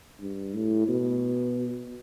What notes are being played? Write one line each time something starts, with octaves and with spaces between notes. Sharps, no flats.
G2
A2
B2